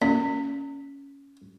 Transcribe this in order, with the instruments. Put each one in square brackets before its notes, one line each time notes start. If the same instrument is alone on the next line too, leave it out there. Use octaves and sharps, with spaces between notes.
[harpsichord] A#2 [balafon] C#4